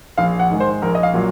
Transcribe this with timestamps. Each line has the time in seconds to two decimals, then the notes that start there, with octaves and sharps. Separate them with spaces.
0.18 A#1 F5
0.39 F#5
0.50 G#2 D#3 G#3
0.60 C5
0.82 A#1 A#4
0.95 D#5
1.03 F5
1.13 A#2 F#3